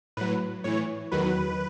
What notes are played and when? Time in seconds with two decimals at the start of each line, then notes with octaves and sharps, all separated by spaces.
0.17 A2 F#3 B4
0.64 A2 E3 C#5
1.12 E2 D#3 F#3 B4